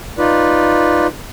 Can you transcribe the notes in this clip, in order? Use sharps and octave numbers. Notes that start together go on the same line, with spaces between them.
D#4 F4 B4 D5